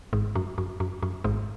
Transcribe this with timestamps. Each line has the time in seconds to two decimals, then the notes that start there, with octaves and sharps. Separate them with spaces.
0.13 G#1 G#2
0.35 F#2
0.58 F#2
0.80 F#2
1.03 F#2
1.24 G#1 G#2